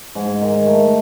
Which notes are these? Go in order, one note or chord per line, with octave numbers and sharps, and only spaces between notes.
G#2
D#3
A3